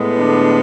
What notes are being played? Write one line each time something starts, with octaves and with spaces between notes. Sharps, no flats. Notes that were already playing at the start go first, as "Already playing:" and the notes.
Already playing: A2 G#3 B3
D3 D4